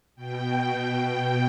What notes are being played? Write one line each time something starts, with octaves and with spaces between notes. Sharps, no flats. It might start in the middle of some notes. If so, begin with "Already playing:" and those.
B2 G5
G5